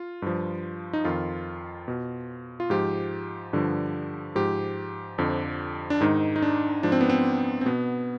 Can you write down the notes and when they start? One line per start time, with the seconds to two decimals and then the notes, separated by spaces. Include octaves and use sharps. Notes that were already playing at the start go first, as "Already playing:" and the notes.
Already playing: F4
0.22 G2 F3
0.93 D#4
1.05 F2 D#3 F4
1.88 B2
2.60 F4
2.70 G#2 F3 G4
3.53 G2 D3 F3
4.35 G#2 F3 G4
5.18 F2 D3 F3
5.90 D4
6.01 G#2 D#3 D#4
6.36 D#4
6.42 D4
6.83 G#2 F3 D4
6.92 C4
7.01 B3
7.10 C4
7.61 C4
7.66 B2 B3